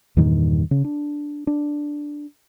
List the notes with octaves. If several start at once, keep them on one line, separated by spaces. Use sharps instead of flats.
E2 G2 A#2 D#3
C#3
D4
D4